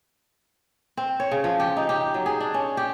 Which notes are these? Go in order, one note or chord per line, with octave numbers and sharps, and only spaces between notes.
C4
C#5
C#3
F3
G4
D#4
G4
F#3
G#4
D4
C#4
G4